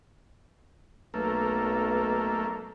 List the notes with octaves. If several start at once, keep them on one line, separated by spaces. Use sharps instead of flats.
B1 A3 A#3